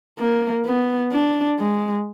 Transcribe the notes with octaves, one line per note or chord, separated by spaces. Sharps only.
A#3
B3
D4
G#3